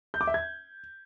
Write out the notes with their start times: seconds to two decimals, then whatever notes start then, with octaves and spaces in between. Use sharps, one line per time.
0.14 G6
0.21 D6
0.27 E5
0.34 G#6